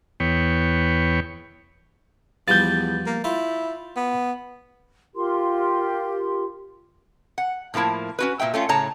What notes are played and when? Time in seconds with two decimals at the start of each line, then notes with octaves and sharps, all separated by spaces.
0.20 E2 B3 C#5 G5
2.48 E2 F3 G3 B3 G6 A6
3.06 A#3
3.24 E4 F4 C#5
3.96 B3
5.15 F4 G4 A#4 C6
7.38 F#5
7.74 A2 F3 A#3 E4 A5
8.19 C#4 F#4 B4
8.40 A#2 C4 E5 G5
8.54 A3 C#4 F4
8.69 A2 C#3 C#5 A5 A#5